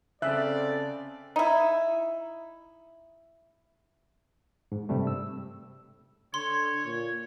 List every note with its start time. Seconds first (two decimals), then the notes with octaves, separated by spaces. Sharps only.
0.22 C#3 C4 A4 D5 E5 F#6
1.36 D#4 E4
4.72 G#2
4.89 G2 C3 G3 A3
5.07 E6
6.34 D3 C#5 C6
6.85 A#2 C#5